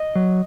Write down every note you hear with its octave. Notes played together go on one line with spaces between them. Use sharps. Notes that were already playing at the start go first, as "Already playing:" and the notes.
Already playing: D#5
F#3